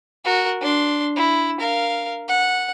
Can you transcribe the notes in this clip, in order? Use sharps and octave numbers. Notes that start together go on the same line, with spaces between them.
F#4 A#4
D4 C6
E4
A#4 F5
F#5